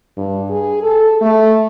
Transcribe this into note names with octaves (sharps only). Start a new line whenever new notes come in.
G2
G#4
A4
A3